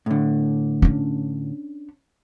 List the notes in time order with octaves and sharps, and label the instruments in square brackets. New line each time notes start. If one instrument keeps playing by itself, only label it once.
[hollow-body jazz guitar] A2 D3
[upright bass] C#4 D4